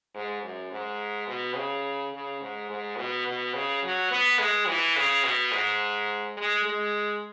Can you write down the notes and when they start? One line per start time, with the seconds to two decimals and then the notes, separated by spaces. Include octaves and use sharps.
0.14 G#2
0.43 F#2
0.72 G#2
1.28 B2
1.56 C#3
2.13 C#3
2.41 G#2
2.70 G#2
2.97 B2
3.27 B2
3.54 C#3
3.83 F#3
4.11 B3
4.39 G#3
4.68 E3
4.96 C#3
5.24 B2
5.52 G#2
6.37 G#3
6.65 G#3